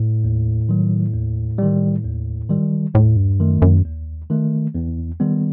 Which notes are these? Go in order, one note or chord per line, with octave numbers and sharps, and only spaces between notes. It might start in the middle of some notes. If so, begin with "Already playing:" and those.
Already playing: A2
D#2
D#3 F#3
D#2
D#3 G3
D#2
D#3 G3
D#2 A2
G2
F#2 D#3 A3
F#2
D#2
D#3 A3
E2
D#3 G3 B3